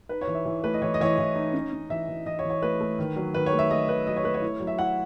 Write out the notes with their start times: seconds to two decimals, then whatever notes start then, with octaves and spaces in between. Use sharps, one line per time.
0.09 D#4 B4
0.21 C#5
0.27 E3
0.35 E5
0.45 E3
0.64 A3 B4
0.74 D#5
0.82 E3 C#5
0.94 D#5
1.01 E3 C#5
1.05 D#5
1.18 E3
1.36 D#4
1.54 C#4
1.72 C#4
1.90 E3 E5
2.08 E3
2.26 E3 D#5
2.39 C#5
2.44 E3
2.50 C#5
2.62 A3 B4
2.81 A3
2.99 D#3
3.16 F#3
3.34 D#3 B4
3.46 C#5
3.53 A3
3.59 E5
3.71 A3 D#5
3.88 D#3 B4
4.07 F#3 D#5
4.16 C#5
4.24 A3 B4
4.34 C#5
4.42 E4
4.60 F#3
4.67 E5
4.78 E4 F#5